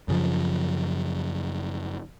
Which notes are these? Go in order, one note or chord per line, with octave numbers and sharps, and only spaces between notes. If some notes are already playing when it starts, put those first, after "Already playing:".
F#2 C#3 F3